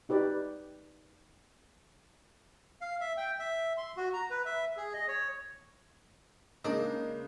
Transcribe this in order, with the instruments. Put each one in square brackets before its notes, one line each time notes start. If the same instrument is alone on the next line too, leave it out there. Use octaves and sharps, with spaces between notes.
[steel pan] D#4 G4 B4 D5
[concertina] F5
E5
G5
E5
C6
F#4
A#5
B4
E5
G#4
D#5
C#5
[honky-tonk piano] C#3 G#3 [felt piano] A#3 [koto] D4 [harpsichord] D#4